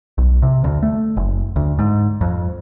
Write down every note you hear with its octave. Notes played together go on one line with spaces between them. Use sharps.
B1
C3
D2
A3
F#1
D2
G#2
F2